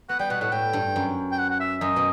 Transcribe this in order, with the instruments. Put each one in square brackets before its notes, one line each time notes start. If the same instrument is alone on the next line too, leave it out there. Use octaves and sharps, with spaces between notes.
[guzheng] B3 [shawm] F#5
[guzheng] G3 [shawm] G5
[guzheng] B2 [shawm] F#5
[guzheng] A2 [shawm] F#5
[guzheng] A2 [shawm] G5
[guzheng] G2
F#2
[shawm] G5
F#5
F#5
E5
[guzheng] F#2 [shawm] D#5
[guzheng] B2